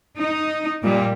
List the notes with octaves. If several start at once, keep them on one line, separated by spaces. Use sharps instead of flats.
D#4
A#2 G3